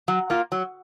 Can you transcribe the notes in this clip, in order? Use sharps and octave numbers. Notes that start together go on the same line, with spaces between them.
F#3
A#3 F4
F#3